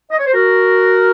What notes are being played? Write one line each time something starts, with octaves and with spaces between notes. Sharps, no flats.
D#5
C#5
C5
F#4 A#4